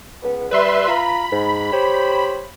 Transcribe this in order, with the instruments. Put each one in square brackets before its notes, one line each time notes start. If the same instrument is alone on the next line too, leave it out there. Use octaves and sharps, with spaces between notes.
[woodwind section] C#2 B3
[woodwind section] G3 [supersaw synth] B4 E5 C6
[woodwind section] F4 F5 A#5 [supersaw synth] B5
[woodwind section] G#2
G4 C5 C#5